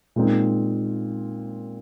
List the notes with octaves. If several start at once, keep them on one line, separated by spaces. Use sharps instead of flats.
A#2 G#3 C4 D#4